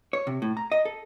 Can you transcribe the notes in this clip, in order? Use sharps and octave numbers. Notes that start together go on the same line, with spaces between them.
C#5
C3
A2
A#5
D#5
A4